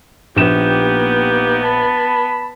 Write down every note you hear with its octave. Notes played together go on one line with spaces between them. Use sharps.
A#1 A#3 B3 D#4 G4 E7
A5 B5